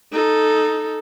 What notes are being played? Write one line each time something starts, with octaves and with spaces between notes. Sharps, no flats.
D#4 A4